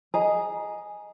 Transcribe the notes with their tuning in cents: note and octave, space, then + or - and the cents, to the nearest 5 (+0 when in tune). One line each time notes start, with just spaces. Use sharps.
G#4 +0 D#5 +0 A#5 +20